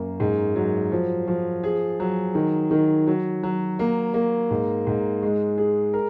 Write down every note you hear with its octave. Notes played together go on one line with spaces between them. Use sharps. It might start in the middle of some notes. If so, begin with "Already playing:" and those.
Already playing: F#2 A#3
G#2
F#3
F3
F3
G#4
F#3
D#3
D#3
F#3
F#3
A#3
A#3
G#2
G#2
G#3
G#4
A#4